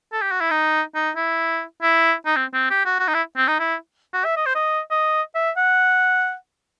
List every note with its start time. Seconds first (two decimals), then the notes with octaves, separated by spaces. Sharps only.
0.12 A4
0.21 G4
0.31 F#4
0.40 E4
0.50 D#4
0.95 D#4
1.16 E4
1.82 E4
2.26 D#4
2.36 C4
2.54 C4
2.70 G4
2.86 F#4
2.99 F#4
3.08 D#4
3.14 E4
3.37 C4
3.47 D#4
3.59 E4
4.14 F#4
4.25 E5
4.36 D#5
4.46 C5
4.55 D#5
4.91 D#5
5.35 E5
5.57 F#5